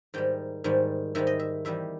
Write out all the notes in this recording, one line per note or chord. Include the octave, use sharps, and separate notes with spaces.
G#2 D#3 G3 G5
G#2 D#3 G3
G#2 D#3 G3 E5
D#5
E5
E2 D#3 G3 E5